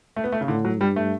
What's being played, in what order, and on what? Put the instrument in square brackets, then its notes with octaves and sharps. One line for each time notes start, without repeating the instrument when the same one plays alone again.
[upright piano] A3
B3
A3
C#3
[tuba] A2 [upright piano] D3
[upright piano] F#3
[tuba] G2 [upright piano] G3
[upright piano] A3